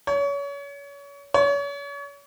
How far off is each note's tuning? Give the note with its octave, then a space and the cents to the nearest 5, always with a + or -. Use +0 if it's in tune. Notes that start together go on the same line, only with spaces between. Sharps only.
C#5 +30
C#5 +35